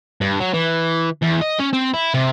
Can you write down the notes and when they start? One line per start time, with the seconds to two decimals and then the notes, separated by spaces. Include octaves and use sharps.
0.21 G2
0.40 F#3
0.53 E3
1.22 E2
1.42 D#5
1.60 C#4
1.73 C4
1.94 E4
2.14 C3